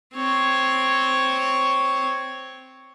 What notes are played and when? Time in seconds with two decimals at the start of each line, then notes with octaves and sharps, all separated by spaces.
0.15 C4 C#5